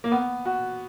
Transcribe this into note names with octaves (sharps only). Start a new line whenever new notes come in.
A#3
B3
F#4